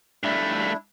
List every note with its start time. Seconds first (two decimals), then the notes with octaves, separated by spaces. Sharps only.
0.23 G2 A3 D4 E4